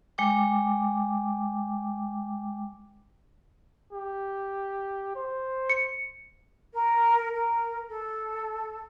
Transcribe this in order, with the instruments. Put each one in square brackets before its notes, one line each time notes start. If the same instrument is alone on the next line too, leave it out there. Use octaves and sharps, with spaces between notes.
[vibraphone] G#3 G5 D6
[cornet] G4
C5
[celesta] C#7
[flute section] A#4
A#4
A4